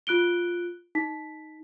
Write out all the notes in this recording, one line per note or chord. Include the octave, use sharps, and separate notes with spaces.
F4 F#6 D7 G7
D#4 B6